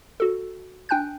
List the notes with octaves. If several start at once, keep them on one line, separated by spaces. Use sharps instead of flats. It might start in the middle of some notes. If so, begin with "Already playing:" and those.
F#4 A4
D4 G5 G#5 F#6 G6